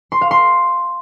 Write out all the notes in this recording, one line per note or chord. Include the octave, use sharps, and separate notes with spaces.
C6
F5
C6